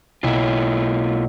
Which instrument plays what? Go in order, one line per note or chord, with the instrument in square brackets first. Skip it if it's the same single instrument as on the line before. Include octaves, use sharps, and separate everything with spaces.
[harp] B1 [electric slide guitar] A#3 E4 F4